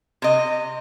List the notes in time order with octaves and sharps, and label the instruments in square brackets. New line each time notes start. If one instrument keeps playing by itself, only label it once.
[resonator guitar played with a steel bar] C3 D#5